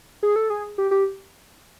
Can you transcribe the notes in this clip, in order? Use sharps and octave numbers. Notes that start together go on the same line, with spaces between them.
G#4
A4
G#4
G4
G4